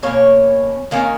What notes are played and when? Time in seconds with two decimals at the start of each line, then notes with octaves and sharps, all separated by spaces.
0.03 B2 A#3 C#4 C#5
0.91 D#3 A#3 C#4